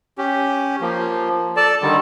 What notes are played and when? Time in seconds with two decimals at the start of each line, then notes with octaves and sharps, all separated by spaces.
0.18 C#4 G4
0.81 F3 A#3
1.56 A4 D5 A5
1.82 D3 D#3 G3